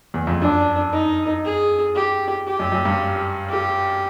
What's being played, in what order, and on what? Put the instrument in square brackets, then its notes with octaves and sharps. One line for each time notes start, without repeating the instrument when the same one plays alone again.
[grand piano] E2
F2
[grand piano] F#2 [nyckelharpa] D4
[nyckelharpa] D#4
G#4
G4
G4
[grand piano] F#2
F#2
G2
[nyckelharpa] G4